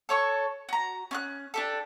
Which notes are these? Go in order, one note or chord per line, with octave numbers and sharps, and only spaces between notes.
A4 C#5 C#6
F#4 A#5
C#4 C6 F#6
D4 G4 A4